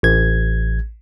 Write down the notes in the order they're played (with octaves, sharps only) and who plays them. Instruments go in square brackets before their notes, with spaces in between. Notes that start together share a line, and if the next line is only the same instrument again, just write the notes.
[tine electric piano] A1 G#6